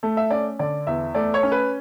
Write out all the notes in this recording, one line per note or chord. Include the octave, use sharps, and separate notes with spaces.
A3
E5
C#4 D5
D3 D5
E2 E5
A3 D5
C#5
C#4
B4